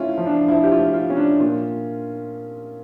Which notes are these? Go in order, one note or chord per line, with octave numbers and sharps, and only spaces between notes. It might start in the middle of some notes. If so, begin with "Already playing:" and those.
Already playing: A3 C#4 E4 F4
F3
D4
F3 E4
G4
F4
A3
F4
C#4
D4
A#2 F4